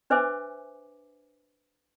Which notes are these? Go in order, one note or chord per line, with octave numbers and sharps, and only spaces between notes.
D4 B4 C5 E5 G#5 D6